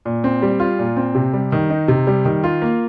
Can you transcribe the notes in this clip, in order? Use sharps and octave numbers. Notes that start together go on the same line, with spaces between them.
A#2
C4
G3
F4
A#2
C4
C3
G3
D#3
D#4
C3
G3
D#3
F4
A#3